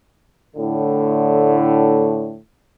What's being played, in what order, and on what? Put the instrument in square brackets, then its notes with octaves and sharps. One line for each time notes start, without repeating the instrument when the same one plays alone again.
[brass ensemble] A2 D3